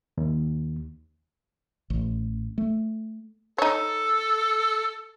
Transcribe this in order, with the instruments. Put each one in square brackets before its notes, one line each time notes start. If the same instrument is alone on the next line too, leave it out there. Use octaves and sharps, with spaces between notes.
[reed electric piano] D#2
[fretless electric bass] A1
A3
[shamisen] D#4 C#5 [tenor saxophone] A4